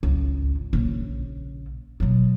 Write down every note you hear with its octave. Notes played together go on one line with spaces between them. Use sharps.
G#1 C#2
A#1 C#3
B2 F#3